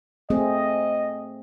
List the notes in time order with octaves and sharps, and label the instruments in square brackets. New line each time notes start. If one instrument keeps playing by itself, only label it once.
[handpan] A3 C4 G#4 [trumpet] D#5